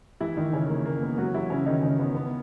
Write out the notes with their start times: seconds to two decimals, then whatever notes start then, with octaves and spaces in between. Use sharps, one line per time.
0.20 E3 E4
0.37 D#3 D#4
0.53 C#3 C#4
0.69 A#3
0.85 A#3
1.02 B3
1.18 F#3 F#4
1.34 E3 E4
1.50 C#3 C#4
1.66 D#3 D#4
1.82 C#3 C#4
1.99 B3
2.15 B3